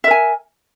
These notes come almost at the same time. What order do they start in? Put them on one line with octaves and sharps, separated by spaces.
E5 A#4 G#5